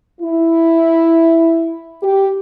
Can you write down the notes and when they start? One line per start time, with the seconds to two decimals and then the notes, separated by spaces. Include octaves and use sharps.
0.21 E4
2.03 G4